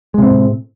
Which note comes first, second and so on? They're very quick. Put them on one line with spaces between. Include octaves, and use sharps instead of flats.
G#3 C3 C4 A2